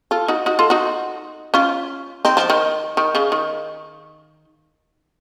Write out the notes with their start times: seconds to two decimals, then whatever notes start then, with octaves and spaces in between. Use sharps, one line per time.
0.11 F4 A4
0.28 D#4 F#4
0.46 D#4 F#4
0.59 F4 A4
0.70 D#4 F#4
1.54 C#4 F4
2.25 C4 D#4
2.37 F3
2.50 D#3
2.97 D#3
3.15 C#3
3.32 D#3